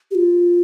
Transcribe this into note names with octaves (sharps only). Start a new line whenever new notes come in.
G4
F4